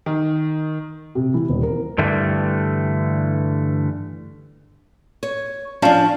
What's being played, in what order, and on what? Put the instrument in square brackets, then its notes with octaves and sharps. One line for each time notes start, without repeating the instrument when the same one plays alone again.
[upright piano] D#3
[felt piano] C3
E3
D#1
A#4
[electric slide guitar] G2 D3 E3 G3 A3
[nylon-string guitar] C#5
[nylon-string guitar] F3 D4 [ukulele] C#4 F5 A5